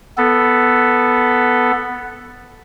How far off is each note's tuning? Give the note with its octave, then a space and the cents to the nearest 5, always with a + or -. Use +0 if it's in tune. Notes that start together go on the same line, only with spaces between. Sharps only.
B3 +0 A4 +0